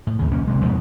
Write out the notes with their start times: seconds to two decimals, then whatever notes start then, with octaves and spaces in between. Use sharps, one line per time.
0.07 A2
0.19 D#2 C#3
0.32 B1 A#3 C#4
0.47 E1 C3 G#3
0.64 E2 G#2 B2 B3